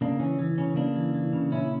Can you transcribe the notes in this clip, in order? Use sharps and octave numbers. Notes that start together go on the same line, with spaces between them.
C#3 A#3 D4
E3 C#4
E3
C#3 C#4
C#3 A#3 D4
E3
E3
C#3
A#2 C#4 E4